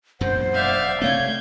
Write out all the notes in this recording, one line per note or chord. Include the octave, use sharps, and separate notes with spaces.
E1 F#2 A#2 C5 F#5
D5 E5 F5
C3 A3 C4 C#5 F5 G6 G#6